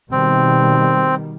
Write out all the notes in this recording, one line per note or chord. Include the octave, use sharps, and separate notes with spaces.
B2 D#3 G3 C4